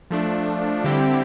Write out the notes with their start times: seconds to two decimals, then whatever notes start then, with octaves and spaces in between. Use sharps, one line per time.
0.11 F3 A3 D4
0.84 D3 G3 C4 E4 G4